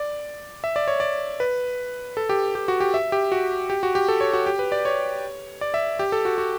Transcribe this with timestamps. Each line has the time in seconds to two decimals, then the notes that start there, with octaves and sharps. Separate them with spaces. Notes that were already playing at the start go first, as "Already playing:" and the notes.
Already playing: D5
0.64 E5
0.76 D5
0.88 C#5
1.00 D5
1.40 B4
2.17 A4
2.29 G4
2.55 G4
2.68 F#4
2.80 G4
2.94 E5
3.12 G4
3.32 F#4
3.70 G4
3.83 F#4
3.95 G4
4.08 A4
4.21 C#5
4.33 F#4
4.46 G4
4.59 B4
4.72 D5
4.85 C#5
5.61 D5
5.74 E5
5.99 G4
6.12 A4
6.25 F#4
6.38 F#4